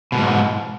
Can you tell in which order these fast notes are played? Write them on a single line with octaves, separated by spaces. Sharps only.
B2 E2 G#2